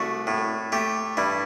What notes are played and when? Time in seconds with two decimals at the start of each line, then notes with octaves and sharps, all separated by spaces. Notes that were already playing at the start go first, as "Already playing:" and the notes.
Already playing: C2 A3 F#4
0.27 A2
0.72 A3 G4
1.17 G2 E4